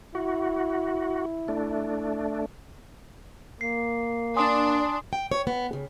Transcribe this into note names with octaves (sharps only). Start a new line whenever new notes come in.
E4 F#4
A3 D4
A#3 C7
D4 G#5 C6 D#6
G5
C#5
B3
C#3